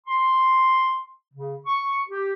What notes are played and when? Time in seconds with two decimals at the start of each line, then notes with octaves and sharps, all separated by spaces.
0.07 C6
1.34 C#3
1.66 C#6
2.09 G4